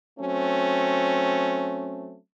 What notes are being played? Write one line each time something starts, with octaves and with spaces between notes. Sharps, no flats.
F#3 A3 C4 C#4